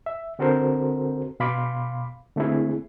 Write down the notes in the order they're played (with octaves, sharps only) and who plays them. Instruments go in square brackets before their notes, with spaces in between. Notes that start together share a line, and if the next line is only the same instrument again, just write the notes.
[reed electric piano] E5
D3 C4 F#4 A4 A#4 C5
B2 F5 B5 C6 D6
D3 A3 A#3 C4 E4 G#4